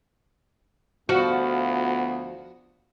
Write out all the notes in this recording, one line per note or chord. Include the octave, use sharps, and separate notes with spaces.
D2 F3 B3 F#4